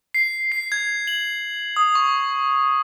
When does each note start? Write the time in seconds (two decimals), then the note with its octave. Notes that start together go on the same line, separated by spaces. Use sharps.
0.14 C7
0.52 C7
0.72 G#6
1.07 F#7
1.76 D#6
1.95 C#6